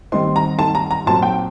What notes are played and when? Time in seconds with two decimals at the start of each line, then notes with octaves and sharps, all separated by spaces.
0.12 D#3 G3 C4 D#4 C6
0.36 A#5
0.59 A5
0.75 A#5
0.91 A#5
1.06 A#2 F#3 C4 A5
1.23 G5